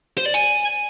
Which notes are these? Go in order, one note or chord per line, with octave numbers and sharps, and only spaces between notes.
C5
D5
G#5